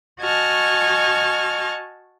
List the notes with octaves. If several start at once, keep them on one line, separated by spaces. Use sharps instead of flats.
F#4 D#5 G#5 A5 C#6 F6